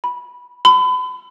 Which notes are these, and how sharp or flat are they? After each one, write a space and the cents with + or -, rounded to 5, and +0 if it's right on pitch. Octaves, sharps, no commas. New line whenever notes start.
B5 -10
B5 +35